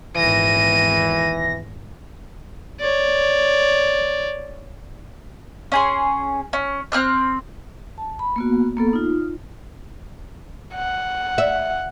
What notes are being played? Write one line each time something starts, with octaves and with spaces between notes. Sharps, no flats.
G#1 E2 A#2 E3 A#6 D#7
C#5 D5
C#4 G#4 C6
C#4
C4 G#4 F6 F#6
A5
B5
A#3 B3 F#4
A#3 B3 A4
D#4 F4
F#5
E5